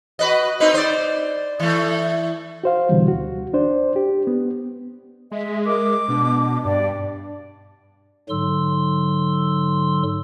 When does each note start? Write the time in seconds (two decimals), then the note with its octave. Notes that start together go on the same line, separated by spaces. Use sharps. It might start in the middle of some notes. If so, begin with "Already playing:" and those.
0.19 F#4 B4 D#5
0.60 C4 D#4 B4
0.74 C5 D5
1.60 E3 A3
2.64 F#4 C5 F5
2.89 B2 D3 E3 G3
3.08 D2 F#4
3.54 D4 C5 D5
3.96 G4
4.27 B3
5.31 G#3 D#5 E5
5.65 A#4 D6
6.08 B2 D4
6.65 G2 D5
8.29 G#2 D3 F#3 C6 E6